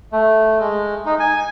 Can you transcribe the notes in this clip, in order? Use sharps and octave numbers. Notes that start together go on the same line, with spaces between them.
A3
G#3
D#4
G#5